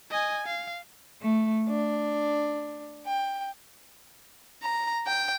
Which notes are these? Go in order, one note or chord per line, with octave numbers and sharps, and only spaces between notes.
D#5 G#5
F5
A3
D4
G5
A#5
G5